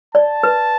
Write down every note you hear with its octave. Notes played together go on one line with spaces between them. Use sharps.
D5 A5
B4